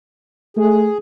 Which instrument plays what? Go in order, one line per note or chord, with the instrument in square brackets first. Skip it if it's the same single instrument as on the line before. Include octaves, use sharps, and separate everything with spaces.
[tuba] A3 [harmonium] G#4